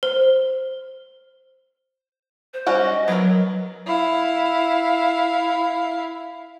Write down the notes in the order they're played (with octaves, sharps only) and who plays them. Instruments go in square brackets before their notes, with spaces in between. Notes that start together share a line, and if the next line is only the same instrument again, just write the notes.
[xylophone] C5
[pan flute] C5
[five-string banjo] G3 C#4 F#4
[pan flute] D#5
[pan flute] F#3 [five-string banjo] B3 A#4
[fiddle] E4 F5